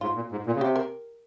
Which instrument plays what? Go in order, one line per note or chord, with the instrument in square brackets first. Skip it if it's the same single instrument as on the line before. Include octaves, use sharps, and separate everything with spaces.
[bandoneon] G#2 [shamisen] F4
[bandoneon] A#2
G#2
A#2
C#3
[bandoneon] C3 [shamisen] G4
[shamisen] A#4